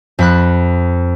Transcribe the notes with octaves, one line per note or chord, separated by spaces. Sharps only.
F2 B5 F#6